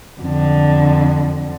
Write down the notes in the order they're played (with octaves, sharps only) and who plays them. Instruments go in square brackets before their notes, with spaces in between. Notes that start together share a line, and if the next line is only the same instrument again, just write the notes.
[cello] F2 D3